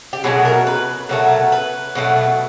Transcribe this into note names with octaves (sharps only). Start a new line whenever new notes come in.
G4
B2 F#3 A3 G#4
A#4
B4
B2 F#3 A3 A#4
B4
B2 F#3 A3